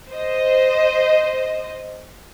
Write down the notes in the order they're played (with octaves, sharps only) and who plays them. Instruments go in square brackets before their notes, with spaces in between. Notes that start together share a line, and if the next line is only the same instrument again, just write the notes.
[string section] C5 D#5